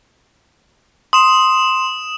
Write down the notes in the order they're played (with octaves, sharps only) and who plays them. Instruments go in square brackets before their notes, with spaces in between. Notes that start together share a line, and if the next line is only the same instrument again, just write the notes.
[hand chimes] C6 [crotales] D#6 E7